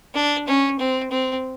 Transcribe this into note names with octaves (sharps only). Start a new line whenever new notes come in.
D4
C#4
C4
C4